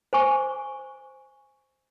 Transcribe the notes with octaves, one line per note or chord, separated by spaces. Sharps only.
C5 G#5 C#6